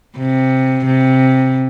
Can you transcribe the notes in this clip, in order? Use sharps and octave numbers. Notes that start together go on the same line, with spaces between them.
C3
C3